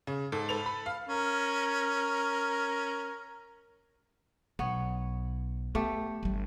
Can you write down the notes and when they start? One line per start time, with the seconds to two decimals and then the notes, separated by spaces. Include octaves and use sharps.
0.07 C#3
0.32 G#2 A4
0.49 A4 B4 F7
0.66 B5
0.86 F5
1.09 C#4 A#4
4.59 B1 B3 C#5
5.75 A3 B3 G4
6.23 G1 G3